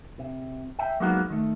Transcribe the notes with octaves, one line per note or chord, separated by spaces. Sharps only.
C3
E5 G5
F#3 G#3 A#3 B3 D#4 F#4
D#3 A3